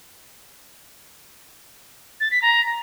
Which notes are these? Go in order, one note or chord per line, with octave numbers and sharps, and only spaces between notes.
A6
B6
A#5